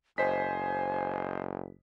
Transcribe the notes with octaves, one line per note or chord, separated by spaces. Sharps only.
F#1 C5 D#5 G#5 B6